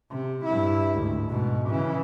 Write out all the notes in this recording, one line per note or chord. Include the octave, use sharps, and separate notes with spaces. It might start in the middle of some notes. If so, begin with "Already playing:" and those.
C3
G2 E4
D2 G#2
G#2 B2
C#3 E3